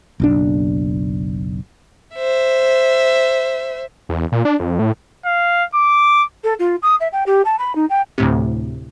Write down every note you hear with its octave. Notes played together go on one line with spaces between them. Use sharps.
F#1 B1 D4
C5 E5
E2
A#2
D4
F2
A2
F5
D6
A4
F4
D#6
E5
G5
G4
A5
B5
D#4
G5
D2 A2 C3